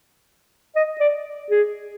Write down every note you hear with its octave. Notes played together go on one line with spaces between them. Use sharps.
D#5
D5
G#4